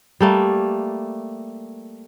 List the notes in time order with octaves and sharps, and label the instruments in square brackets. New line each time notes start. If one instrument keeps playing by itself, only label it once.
[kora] G3 A3 A#3